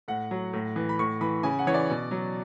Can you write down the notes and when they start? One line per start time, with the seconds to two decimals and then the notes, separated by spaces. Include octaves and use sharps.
0.08 A2 F#5
0.31 F#3
0.53 A2
0.76 E3
0.89 B5
0.99 A2 C#6
1.21 E3 B5
1.43 C#3 G#5
1.59 F#5
1.67 E3 C#5
1.74 D5
1.90 B2
2.11 F#3